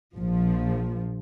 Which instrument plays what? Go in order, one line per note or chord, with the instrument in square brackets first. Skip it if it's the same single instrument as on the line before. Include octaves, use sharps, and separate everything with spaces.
[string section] A#1 F3